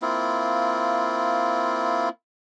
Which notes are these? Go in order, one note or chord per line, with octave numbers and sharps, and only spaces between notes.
A#3 C4 E4 F4